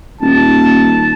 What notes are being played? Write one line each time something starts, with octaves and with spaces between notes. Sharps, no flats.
D#1 A5